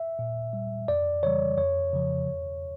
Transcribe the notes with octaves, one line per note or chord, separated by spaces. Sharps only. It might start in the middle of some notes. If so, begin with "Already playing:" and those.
Already playing: E5
A#2
G3
F2 D5
C#3 E3 G3 C#5
F2 C#5
C#3 F3
E2